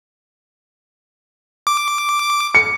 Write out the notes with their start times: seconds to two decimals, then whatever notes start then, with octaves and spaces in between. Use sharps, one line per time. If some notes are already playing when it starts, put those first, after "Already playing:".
1.67 D6
2.55 C#7